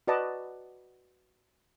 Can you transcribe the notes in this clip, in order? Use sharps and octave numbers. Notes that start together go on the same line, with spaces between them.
F#4 B4 D5 D#5 A5